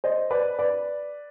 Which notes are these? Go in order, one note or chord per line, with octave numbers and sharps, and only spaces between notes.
C5 D#5
B4 D5
B4 D5